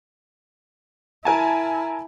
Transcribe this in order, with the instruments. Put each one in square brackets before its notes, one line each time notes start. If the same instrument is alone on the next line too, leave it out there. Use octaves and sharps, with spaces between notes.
[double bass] E4 [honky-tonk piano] A#4 G#5 A5